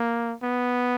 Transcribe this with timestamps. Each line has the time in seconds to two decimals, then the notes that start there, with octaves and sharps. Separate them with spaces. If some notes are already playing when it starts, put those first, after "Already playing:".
Already playing: A#3
0.43 B3